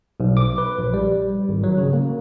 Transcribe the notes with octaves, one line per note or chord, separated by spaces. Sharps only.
B1
D6
B4
A#1
G3
G#1
F#3
C#3
A#3